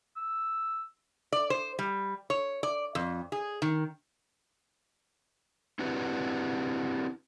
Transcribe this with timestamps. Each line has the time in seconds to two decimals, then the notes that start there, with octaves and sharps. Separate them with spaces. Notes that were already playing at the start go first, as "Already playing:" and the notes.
0.16 E6
1.32 D5
1.50 C5
1.79 G3
2.30 C#5
2.63 D5
2.95 F2
3.32 G#4
3.62 D#3
5.79 C4 D4 E4 F#4 G4 B4